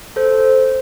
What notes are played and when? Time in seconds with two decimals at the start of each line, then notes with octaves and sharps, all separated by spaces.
0.16 A4 C5